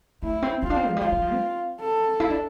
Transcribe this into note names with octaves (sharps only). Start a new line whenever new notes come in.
A3 E4
C4
C4 F4
D4
C4
F3
G3
F3 F4
G3
F3
C4
A4
E4
D4